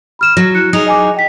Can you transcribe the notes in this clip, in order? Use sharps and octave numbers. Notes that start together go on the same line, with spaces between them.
B5 F6 E7
F#3 A#6
E4 F#6 C#7
F#3 D#4 G#4 D#6 F7
D#5 G#5 D6
D#5 G5 B6